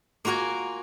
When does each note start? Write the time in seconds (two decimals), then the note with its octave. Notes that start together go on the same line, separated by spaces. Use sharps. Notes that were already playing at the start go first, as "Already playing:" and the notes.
0.25 A#3 F4 F#4 A#4 G#5